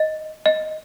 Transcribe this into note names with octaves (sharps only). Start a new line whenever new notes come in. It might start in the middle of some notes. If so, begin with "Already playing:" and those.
Already playing: D#5
D#5